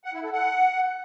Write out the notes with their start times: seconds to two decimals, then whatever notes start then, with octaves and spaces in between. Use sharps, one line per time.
0.04 F#5
0.14 E4
0.23 A4
0.33 F#5